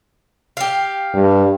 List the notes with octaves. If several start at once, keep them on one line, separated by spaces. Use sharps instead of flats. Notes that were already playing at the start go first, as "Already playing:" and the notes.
G4 F5
G2